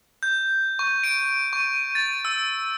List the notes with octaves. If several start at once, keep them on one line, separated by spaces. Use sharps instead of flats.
G6
C#6
D7
C#6
A6
E6